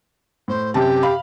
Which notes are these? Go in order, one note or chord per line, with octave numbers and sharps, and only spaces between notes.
A2 C5
F#2 C3 G4 A5
F5 B5